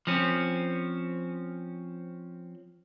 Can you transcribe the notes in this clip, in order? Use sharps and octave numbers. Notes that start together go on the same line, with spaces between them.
F3 C4 C#4